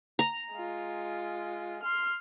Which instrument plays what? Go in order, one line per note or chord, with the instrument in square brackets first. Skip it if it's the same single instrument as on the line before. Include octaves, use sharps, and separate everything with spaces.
[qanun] A#5
[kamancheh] G#3 F4
C6 F6